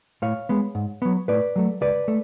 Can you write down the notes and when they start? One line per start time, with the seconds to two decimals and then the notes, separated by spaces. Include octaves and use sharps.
0.22 A2 C#5 F5
0.49 G#3 B3
0.75 G#2
1.02 F#3 B3
1.28 A2 B4 D5
1.56 F#3 A3
1.81 C#2 B4 D5
2.08 A3